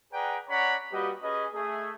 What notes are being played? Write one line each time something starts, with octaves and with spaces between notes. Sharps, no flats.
G#4 B4 D5 F#5 G5 A#5
C#4 C#5 D5 F#5 A#5 B5
G3 A#3 F#4 G4 B4 D#5
C#4 G#4 B4 D#5
A3 G#4